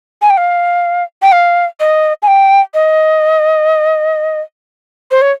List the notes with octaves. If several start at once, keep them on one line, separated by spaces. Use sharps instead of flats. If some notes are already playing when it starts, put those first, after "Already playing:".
G#5
G5
F5
G5
F5
D#5
G#5
G5
D#5
C5
C#5